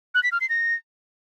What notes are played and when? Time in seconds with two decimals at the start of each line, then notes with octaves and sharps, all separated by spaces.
0.15 F#6
0.23 B6
0.32 F6
0.41 C7
0.49 A#6